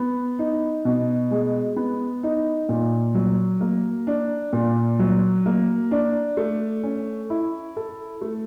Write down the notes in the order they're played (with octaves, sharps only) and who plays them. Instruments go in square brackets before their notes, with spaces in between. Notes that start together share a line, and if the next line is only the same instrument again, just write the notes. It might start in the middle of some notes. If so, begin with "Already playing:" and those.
Already playing: [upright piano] B3
D#4
B2
G#3
B3
D#4
A#2
F#3
A#3
D4
A#2
F#3
A#3
D4
A3
C#4
E4
A4
A3